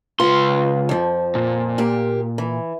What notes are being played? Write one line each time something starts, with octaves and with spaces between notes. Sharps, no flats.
C#2 F4 B4 F5 C6
F2 F3
A#2
A#3 G4
E3